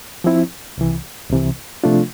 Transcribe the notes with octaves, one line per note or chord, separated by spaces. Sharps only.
F3 C4 E4
C2 C3 E3
C2 C3 E3
C3 F3 A3 D4 F4